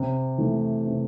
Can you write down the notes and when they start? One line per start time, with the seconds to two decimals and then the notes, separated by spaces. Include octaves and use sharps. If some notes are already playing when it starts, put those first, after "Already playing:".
Already playing: C3
0.38 E3 A3
0.85 C3